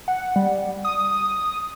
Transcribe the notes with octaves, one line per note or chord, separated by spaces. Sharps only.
F#5
G3
D#6